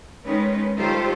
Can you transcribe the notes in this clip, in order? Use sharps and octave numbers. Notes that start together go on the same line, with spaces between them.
D#3 G#3 C#4 D#4 B4
D#3 G3 F4 G4 A4 C5